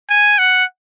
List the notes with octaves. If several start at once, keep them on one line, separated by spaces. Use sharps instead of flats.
G#5
F#5